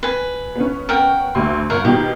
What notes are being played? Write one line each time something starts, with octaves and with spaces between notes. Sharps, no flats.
B4 G#5
B3 C#4
A#4 F#5 G5
D2 C6
G1 A#4 C#5 F#5
B2 D#3 G4 G6